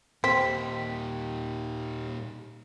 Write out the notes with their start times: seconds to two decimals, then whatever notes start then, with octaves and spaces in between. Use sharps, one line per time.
0.24 D#2 A#2 C4 D#4 B6